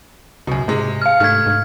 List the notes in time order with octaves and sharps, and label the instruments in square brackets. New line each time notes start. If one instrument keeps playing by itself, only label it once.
[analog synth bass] C#2 [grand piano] F#2 B2
[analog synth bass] G#2 [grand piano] C3 G#3
[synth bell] F5 F6
[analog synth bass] G#2 [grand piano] C3 A3 [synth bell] F6 G#6
[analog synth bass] G#2